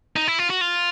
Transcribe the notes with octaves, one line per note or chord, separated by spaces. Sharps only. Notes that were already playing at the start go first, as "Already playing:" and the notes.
D#4
E4
F4
F#4
F4